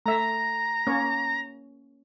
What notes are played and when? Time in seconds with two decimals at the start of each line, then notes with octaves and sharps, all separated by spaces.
0.06 A3 E5 A#5
0.87 A#3 C#4 C#5